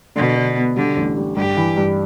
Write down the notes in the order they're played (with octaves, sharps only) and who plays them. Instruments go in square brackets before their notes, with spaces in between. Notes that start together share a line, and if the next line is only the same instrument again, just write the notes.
[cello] B2 [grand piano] D3
[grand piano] D3
B3
[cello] D3 [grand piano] G3
[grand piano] A1
G3
[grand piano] G2 [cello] G4
[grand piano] E3
G2